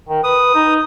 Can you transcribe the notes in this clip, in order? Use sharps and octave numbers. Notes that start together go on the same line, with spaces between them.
D#3
B4 D#6
D#4